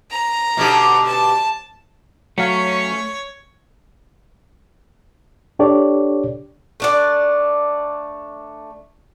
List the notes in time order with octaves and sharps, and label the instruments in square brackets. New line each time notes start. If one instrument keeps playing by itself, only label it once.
[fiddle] A#5
[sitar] B2 D3 G4
[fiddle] A5
[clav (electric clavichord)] F#3 F5 [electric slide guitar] A3 [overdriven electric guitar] C#4 [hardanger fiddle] C#5
[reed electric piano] D4 G4 A4 C#5 D5
[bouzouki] A3 D4 D5